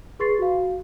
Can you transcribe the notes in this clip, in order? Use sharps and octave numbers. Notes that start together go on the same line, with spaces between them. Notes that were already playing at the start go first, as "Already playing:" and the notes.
G#4 B4 C6 C#6 A6 C7
F#4 F5